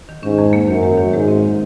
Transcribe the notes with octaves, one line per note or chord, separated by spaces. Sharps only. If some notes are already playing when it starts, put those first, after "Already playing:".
D#3
G#2 C#4
F2
A#3
F#2 D#3
G#3
D#3
G#2 G#3
C4
D#3